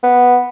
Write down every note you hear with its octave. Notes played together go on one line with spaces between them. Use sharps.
B3